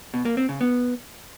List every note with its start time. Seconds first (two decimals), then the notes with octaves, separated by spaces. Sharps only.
0.14 B2
0.25 A#3
0.37 C4
0.49 C#3
0.61 B3